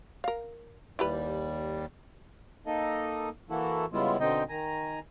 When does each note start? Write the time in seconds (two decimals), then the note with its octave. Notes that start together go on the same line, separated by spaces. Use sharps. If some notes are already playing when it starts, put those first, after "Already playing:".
0.24 A#4 F5
0.99 D#2 G3 E4 G4 B4
2.66 A#3 D#4 A4 D#5
3.50 E3 A#3 E4 F#4 A4
3.93 C#3 G3 G#3 B3 E4 F4
4.20 B2 D3 C4 D#4 D#5 G5
4.49 D#3 G#5 A#5